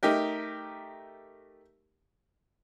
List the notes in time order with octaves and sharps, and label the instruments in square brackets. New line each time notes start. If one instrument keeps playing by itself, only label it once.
[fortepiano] A3 D#4 G4 A#4